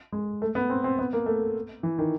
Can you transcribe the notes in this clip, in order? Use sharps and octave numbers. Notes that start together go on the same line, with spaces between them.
G#3
A3
B3
C4
C4
B3
A#3
A3
E3
D#3